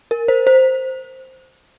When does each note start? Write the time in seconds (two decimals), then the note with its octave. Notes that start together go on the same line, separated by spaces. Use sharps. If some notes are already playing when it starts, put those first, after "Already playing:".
0.11 A#4
0.28 C5
0.47 C5